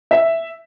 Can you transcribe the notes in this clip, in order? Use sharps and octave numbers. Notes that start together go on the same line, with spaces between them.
E5